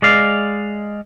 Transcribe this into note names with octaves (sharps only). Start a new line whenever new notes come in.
G#3 D5 F5